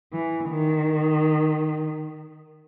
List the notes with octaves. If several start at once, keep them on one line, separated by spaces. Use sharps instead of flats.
E3
D#3